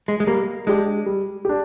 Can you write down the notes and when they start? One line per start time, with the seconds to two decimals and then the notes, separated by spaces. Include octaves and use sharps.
0.08 G#3
0.20 G#3
0.27 G3 A#3
0.67 G#3 D4 G4
1.06 G3
1.45 D4 G4